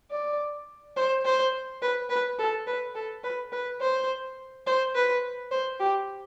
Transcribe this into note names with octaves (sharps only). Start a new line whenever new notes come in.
D5
C5
C5
B4
B4
A4
B4
A4
B4
B4
C5
C5
B4
C5
G4